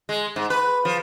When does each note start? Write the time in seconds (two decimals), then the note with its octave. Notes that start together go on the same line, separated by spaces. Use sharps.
0.09 G#3
0.36 G#2
0.50 B4
0.85 F3